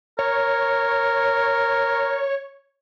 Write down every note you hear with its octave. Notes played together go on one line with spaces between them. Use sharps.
A#4 C#5